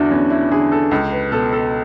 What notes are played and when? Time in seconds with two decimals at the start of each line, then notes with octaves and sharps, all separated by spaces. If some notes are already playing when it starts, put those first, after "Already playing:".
Already playing: E2 D3 D4 E4 F#4
0.11 E2 C#4
0.30 E4
0.51 D3 G#4
0.72 A4
0.91 C#2 A4
1.12 B4
1.31 B2 A4
1.53 A4